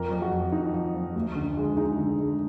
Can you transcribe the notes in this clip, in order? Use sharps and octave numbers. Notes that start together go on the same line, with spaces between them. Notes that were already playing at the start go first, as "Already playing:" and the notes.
Already playing: F2 A#4
F2
F#4
F2
F3 D#4
F3
F2
D2
D3
G#3
G#3 D#4
D3
G#3